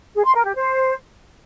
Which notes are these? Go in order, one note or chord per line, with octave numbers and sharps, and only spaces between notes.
G#4
C6
A#4
G4
C5